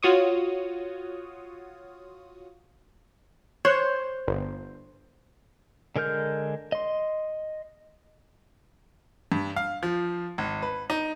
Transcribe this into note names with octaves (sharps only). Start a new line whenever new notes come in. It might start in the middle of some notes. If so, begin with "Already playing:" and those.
F4 F#4 C#5 D#6
C5 C#5 F#6
G1
D3 G#3 A#4 F6 G6
D#5 C6
G2
F5
F3
G#1
B4
D#4